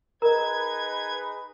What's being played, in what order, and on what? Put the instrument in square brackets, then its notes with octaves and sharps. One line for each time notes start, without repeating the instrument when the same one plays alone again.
[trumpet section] D#4 G#4 B4 [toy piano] A#4 [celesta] D#5 A#5 [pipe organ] G#6